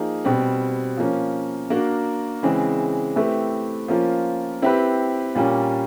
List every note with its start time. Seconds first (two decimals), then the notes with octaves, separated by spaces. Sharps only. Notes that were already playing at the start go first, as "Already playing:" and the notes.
Already playing: F3 A#3 D#4 G#4
0.25 B2 G3 C4
0.97 F3 A#3 C#4
1.70 A#3 D4 F#4 A#4
2.43 C#3 E3 G#3 C4
3.15 A3 C4 E4 G4 B4
3.88 F3 A#3 C#4 F4
4.62 C4 E4 G4 B4
5.35 A#2 G3 A#3 C#4